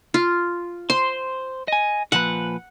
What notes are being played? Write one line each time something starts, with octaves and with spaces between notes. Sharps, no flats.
F4
C5 C6
D#5 G#5
A#2 F3 B4 F#5